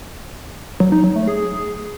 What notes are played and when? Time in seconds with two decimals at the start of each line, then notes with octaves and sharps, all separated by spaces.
0.80 F#3
0.92 D#4
1.04 F#3
1.16 A3
1.27 G#4